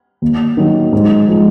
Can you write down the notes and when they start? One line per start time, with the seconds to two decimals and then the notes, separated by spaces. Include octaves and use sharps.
0.22 D#2
0.57 D#3 F#3
0.93 G#2
1.29 F3 G#3